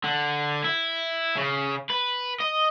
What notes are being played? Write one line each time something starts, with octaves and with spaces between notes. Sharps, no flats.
D3
E4
C#3
B4
D#5